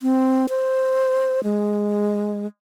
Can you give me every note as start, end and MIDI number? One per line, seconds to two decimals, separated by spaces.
0.02 0.46 60
0.49 1.40 72
1.44 2.47 56